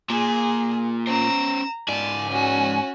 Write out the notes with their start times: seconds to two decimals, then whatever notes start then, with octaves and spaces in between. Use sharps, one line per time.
0.10 A#2 G#4
1.07 C#4 C5 A#5 E7
1.89 G#2 D5 G#5 A5
2.29 C#4 F#4